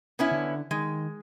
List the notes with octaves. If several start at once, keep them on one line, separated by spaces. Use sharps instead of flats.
B3 C#4 E4
D3
D#3 G#3